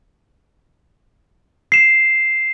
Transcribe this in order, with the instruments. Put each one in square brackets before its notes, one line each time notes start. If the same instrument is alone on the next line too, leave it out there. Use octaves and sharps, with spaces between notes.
[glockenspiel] C7 E7